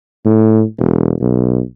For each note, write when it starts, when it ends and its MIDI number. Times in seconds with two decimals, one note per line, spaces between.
0.25 0.63 45
0.78 1.14 28
1.20 1.61 35